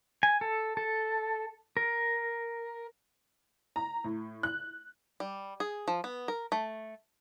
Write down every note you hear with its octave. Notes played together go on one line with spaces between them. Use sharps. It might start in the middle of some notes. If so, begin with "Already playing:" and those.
G#5
A4
A4
A#4
A#5
A2
F#6
G3
G#4
F3
B3
A#4
A3